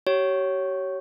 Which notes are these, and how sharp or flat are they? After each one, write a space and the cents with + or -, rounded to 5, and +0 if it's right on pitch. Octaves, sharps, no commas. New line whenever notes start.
G4 -40 C#5 +0